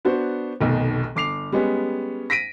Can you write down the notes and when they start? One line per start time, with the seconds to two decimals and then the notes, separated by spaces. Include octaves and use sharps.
0.05 B3 D4 F#4 C5
0.61 F1 B1 B2 D#3
1.15 G1 D6 C7 F7
1.52 G3 G#3 B3 C#4
2.30 A#6 B6 D7 D#7